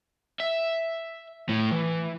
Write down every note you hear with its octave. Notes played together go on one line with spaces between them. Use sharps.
E5
A2
E3